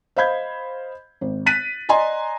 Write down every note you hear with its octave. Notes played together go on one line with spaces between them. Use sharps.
C5 D#5 F5 B5 G6 G#6
G#1
F#6 A6 B6 D#7
D5 D#5 G#5 A#5 C6